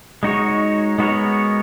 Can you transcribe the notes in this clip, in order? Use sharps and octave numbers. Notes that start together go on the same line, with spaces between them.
G#3 D#4 F#4 C#5
G#3 B3 F#4 A#4 C#5